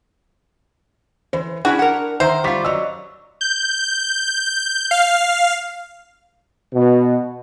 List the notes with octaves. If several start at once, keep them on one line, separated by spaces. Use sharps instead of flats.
E3 C5
C#4 D4 E4 F#4 G#4
A#4 F#5
D#3 C5 E5 A#5
G3 F4 C#6 D6 B6
F#2 F#3 D5 D#5 E6
G6
F5
B2